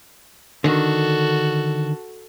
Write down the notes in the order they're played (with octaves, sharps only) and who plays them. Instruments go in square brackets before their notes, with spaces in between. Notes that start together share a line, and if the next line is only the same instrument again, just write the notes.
[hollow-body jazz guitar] D3 D#3 [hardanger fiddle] F#4 A4